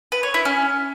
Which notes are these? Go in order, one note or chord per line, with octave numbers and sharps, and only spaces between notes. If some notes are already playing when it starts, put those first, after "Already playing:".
B4
C#5
E4
C#4